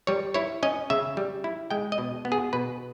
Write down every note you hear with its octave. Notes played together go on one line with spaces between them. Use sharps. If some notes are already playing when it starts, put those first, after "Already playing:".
G3 C#5
E4 C#5
C#4 D#5
C#3 E5
G3
E4
G#3 G5
D#5
B2
B3
G#4
B2 B4